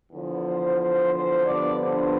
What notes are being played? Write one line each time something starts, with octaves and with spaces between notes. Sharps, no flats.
E2 D3 F3
C5
C5
C5
G2 D3 F3 B3 D4 D5
C5